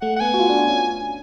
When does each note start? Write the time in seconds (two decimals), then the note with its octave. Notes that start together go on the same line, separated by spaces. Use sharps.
0.01 A3 F#5
0.16 F#5
0.20 B3 G#5
0.34 F#4
0.40 F4
0.49 D4
0.59 F4
0.68 C#4